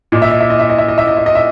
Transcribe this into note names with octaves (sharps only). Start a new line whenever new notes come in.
A#2 D#5
E5
D#5
E5
D#5
E5
D#5
E5
D#5
E5
D#5
E5
D#5
E5